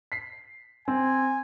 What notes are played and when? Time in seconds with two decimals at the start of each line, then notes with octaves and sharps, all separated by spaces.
0.12 B6 C7
0.88 C4 G#5